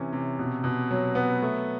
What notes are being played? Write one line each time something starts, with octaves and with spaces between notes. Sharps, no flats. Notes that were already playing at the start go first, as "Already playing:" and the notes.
Already playing: C3 E3 C#4
C3
B2
B2
F#3
B3
A3